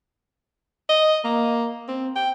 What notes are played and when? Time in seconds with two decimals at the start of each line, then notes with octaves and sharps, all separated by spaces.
0.89 D#5
1.25 A#3
1.88 C4
2.16 G5